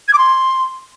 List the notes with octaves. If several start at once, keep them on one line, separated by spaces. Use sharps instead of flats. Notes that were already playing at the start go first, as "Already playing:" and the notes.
G#6
D6
C6